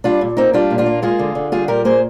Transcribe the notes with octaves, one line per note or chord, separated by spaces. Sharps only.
G3 D4 F4
A#2
A#3 C4 D#4
G3 D4 F4
A#2
D4 F4
A#3
G#3 F4 G#4
D3
D3
G3 F4 G#4
A#2 G4 A#4
A#3 G#4 C5